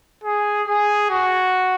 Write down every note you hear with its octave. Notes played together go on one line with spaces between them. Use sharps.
G#4
G#4
F#4